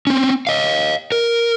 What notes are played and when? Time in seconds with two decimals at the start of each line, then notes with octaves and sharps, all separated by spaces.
0.07 C4 C#4
0.47 D#5 F5
1.12 A#4